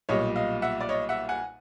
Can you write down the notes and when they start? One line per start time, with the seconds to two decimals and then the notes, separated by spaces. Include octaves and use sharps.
0.09 B1 A#2 G3 C#5 D#5
0.36 D#5 F5
0.62 E5 F#5
0.81 D5
0.89 C#5 D#5
1.09 E5 F#5
1.29 F#5 G#5